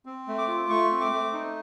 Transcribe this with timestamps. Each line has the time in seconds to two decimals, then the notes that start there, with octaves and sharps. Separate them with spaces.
0.06 C4
0.28 A3
0.38 D6
0.48 F4
0.70 A3 C#6
0.91 C4
1.01 D6
1.12 A3
1.33 D#4